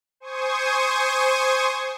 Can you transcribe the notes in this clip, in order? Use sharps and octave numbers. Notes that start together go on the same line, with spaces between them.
C5 G#5 C#6 D#6